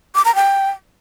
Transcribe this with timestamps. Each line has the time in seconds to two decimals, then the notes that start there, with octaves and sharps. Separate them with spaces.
0.15 D6
0.25 A#5
0.35 G5